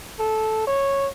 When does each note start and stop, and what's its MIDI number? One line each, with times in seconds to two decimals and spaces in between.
0.19 0.66 69
0.67 1.09 73